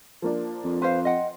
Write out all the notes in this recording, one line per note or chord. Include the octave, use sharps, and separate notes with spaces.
F3 A#3 D4
F2
B4 C5 F5 C6
D#5 F#5 G5